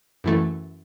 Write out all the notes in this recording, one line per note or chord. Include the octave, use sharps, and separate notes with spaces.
F#2 E3 A3